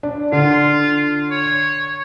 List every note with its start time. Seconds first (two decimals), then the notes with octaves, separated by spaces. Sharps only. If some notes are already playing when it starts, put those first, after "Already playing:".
0.03 D4
0.32 D3 F4
1.31 C#5